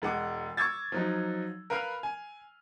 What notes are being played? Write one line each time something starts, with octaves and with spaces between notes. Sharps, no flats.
E1 G#3 F#5 D6
C#6 D6 E6 G#6 A6
F3 F#3 D#4
A#4 B4 F5 B5 F6
G#5